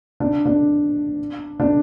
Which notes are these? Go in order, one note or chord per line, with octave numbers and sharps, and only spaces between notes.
D4
D4
D4